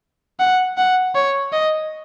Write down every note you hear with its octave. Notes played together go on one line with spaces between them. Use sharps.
F#5
F#5
C#5
D#5